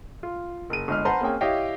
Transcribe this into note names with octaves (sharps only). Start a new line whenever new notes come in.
F4
F#1 D#7
G1 G#3 F6
B4 C5 F#5 A5 A#5 C6
A#3 C4 C#4 G#4 G5 G#5
E4 G4 C#5 D#5 F5 G5